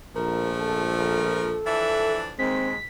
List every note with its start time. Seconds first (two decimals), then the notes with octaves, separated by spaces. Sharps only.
0.15 A#1 F3 G#3 A3 A#4
0.60 A4
0.99 A#4
1.67 E3 F3 D4 E5
2.39 D#2 G#3 C4 B6